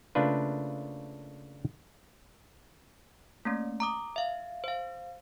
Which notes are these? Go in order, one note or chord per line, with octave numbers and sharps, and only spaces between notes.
C#3 A3 A#3 D4 F4 B4
A3 A#3 C#4
A#5 D6 D#6
E5 F5
C5 F5